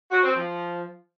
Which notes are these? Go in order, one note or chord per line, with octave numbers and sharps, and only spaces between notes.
F#4
C4
F3